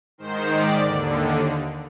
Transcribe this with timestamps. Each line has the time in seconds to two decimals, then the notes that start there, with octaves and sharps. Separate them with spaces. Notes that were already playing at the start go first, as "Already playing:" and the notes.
0.18 G#2 D#3 C5
0.51 D5
0.83 D#2 D3